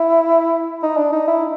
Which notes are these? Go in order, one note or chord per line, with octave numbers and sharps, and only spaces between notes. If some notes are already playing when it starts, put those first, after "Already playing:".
Already playing: E4
D#4
D4
D#4
E4